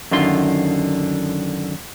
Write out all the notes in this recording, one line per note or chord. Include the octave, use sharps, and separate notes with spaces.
F#2 D3 D#3 F4 C6